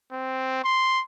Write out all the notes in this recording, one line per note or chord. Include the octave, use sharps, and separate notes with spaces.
C4
C6